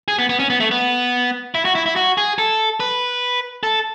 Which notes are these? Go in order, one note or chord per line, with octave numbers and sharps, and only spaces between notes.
G#4
B3
B3
C#4
B3
A3
B3
E4
F#4
E4
E4
F#4
G#4
A4
B4
A4